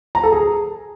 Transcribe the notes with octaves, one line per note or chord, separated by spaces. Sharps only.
A#5
A4
G#4